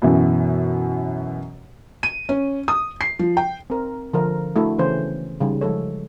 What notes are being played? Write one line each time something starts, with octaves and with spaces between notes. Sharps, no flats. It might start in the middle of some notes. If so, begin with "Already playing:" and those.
F#2 B2 E3
D#7
C#4
D#6
C7
F3
G5
C4 A#4
D3 F3 A#4
A3 D4 E4 F#4 A4
C#3 E3 C#4 C5
C#3 G3 D#4
F3 G#3 A4 C#5